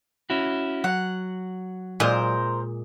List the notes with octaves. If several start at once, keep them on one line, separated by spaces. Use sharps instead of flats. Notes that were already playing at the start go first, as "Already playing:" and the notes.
C#4 E4 F#4
F#3 F#5
A#2 G#3 A#4 C5